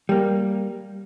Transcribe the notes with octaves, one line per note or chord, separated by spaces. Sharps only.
G3 A#3